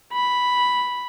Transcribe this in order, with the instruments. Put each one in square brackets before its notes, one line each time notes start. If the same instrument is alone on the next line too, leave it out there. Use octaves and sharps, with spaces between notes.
[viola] B5